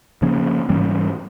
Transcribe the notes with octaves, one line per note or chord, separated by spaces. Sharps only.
C#3 F3 A#3 C#4
G#2 E3 G3 C#4